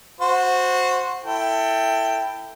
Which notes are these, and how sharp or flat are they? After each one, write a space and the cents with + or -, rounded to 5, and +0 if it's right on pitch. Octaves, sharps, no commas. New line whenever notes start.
F#4 -15 C5 +0
E4 +0 A4 +25 G5 +0